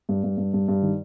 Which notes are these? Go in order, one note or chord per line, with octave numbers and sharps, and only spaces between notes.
G2
G2
G2
G2
G2
D#3